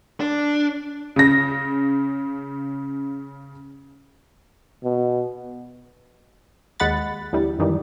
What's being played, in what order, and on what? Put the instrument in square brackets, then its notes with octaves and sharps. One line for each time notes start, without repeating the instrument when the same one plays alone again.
[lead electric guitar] D4
[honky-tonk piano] C#3 A#6
[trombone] B2
[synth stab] D#2 G#3 F#5 B5 A6
D2 E3 G3
F#2 D#3 E3 G3